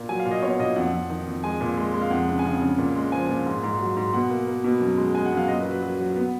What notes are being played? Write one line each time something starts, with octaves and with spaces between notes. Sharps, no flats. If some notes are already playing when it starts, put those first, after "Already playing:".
Already playing: A#2
F#3 G#5
F5
A#2
D#5
B3 C#5
A#2 D#5
F2 F#5
F2
D#3
F2
G#3 G#5
A#2
G#3
G#3
F5
F2 F#5
C#3
G#5
C#3 F#5
C#3
A#2
G#3
F3 G#5
A#2
G#2
G#2
F#3
G#2
B2 F#5
A#3
A#3
B2
F#2
G#3
G#3 G#5
F#5
F#2
F5
A#2 D#5
B4
F#3
B4
F#3
F#3
B3